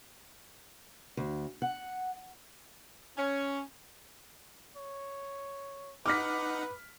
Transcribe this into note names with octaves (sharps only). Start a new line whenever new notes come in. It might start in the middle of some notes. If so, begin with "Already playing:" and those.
D2
F#5
C#4
C#5
D#4 B4 F#5 D6 F6 B6